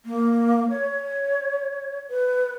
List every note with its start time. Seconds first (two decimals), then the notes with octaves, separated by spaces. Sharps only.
0.06 A#3
0.70 C#5
2.10 B4